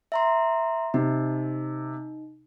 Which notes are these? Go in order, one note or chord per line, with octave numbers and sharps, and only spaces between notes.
E5 A#5 C6
C3 D#4